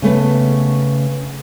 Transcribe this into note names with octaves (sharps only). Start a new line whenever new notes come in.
C#3 A3 B3